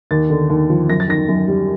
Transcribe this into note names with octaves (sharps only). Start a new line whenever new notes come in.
D#2 A6
D3
D#2
F3
F#2 A#6
A6
D#3 A#6
F#2
G3